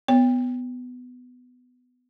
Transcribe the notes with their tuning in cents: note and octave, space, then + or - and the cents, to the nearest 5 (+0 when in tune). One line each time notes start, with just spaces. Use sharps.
B3 +15 C#5 +0